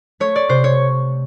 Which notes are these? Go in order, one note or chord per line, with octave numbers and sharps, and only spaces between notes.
A3 C#5
D5
C3 C5
C#5